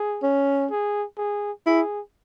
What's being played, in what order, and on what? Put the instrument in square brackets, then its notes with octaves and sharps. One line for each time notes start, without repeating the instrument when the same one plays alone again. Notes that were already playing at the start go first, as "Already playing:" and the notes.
Already playing: [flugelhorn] G#4
[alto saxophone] C#4
[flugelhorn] G#4
G#4
[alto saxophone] E4 [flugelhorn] G#4